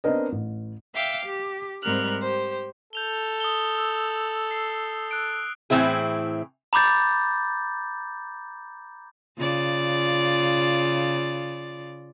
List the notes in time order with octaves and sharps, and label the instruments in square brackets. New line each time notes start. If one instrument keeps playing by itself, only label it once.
[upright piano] B3 C4 D4 A#4 D#5
A1
[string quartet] E5 F5 G5 D6
G4
G#2 G3 C4 A#4 F6 F#6
G4 C5
[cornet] A4 [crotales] G6 F7 G7
[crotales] D#6 G7
E6
C7
F#6 D7
[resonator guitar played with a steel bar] A2 E3 C4 E4 G#4
[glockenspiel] A#5 B5 D6 G6 A6
[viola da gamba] C#3 F4 D5